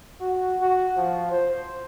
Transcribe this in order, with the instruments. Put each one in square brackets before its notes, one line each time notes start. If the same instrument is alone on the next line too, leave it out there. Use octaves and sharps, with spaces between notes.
[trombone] F#4
F#4
F3
C5